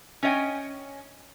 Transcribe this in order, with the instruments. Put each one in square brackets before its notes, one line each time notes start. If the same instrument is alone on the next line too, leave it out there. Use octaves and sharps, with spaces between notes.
[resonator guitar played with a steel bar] C#4 C#5 D#5 E5 G5 G#5